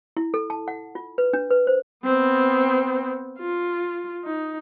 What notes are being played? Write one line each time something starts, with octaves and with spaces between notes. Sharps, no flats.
E4
A4
A5
F#5
F4
B4
D4
B4
C5
B3 C4
F4
D#4